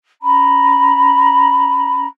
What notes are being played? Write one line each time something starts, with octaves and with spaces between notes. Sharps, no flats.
C#4 A#5 B5